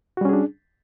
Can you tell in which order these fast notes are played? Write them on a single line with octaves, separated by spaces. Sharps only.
F#4 G3 C#4 G#4 D4